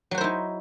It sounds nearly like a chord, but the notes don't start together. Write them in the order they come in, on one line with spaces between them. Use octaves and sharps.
F#3 F#4 C5 E4 D#4